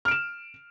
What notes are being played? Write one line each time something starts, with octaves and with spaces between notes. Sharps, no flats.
F6 D7 E7